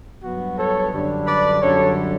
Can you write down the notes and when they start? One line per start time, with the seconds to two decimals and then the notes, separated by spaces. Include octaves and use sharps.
0.23 G2 F#3 B3 F#4
0.58 A4 C#5
0.93 F#2 D3 G3 D4
1.27 B4 D5
1.61 F#2 D3 G3 A4 C#5